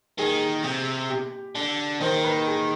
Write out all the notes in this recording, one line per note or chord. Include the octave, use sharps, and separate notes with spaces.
D#3 G#4
C3
G4
D3
D#3 C5
B4
G#4